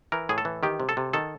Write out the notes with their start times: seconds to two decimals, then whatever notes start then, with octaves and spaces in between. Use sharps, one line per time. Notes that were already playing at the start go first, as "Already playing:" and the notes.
0.12 E3 A#4
0.29 A2 G#4
0.38 A4
0.45 E3
0.63 D#3 G4
0.80 C3
0.89 A4
0.97 C3
1.13 D#3 A4